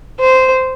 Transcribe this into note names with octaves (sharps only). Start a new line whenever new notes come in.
C5